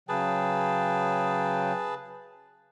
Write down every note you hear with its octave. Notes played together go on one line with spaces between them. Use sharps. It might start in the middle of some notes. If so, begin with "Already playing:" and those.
C#3 F#3 G#4 B4 G5 A5